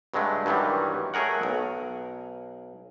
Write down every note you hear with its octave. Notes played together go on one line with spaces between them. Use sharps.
G2 C#3 F#3 G#3 A3
G2 D#3 E3 F#3 G3
F#3 A3 G#4 A#4 F#5
B1